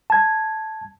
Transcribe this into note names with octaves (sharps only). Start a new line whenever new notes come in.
A5 G#6